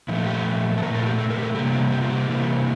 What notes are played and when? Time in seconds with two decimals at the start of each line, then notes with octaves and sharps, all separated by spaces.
0.08 A#2 F3 A3 E4
0.26 G4
0.78 A4
0.82 A#2 A3 A#4
0.94 A4
1.02 F4
1.06 G4
1.18 A4
1.30 A#4
1.38 G4
1.43 A4
1.55 C3 G3 A#3 G4
1.73 F4
1.92 G4
2.01 F4
2.11 G4
2.29 C3 E3 G3 A#3